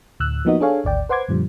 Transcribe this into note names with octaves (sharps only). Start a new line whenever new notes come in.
D2 A2 E6 F#6
F3 A#3 B3 D#4 F#4 D#5
D4 G#4 A4 C#5 F5 G#5
G#1 D2 D5 G5
B4 C5 F#5 C6 D6 G#6
F#2 A#2 D3 F3 G3